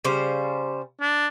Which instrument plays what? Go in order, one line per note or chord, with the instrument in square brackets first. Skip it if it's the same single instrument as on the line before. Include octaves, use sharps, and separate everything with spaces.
[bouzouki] C#3 G3 C5
[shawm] D4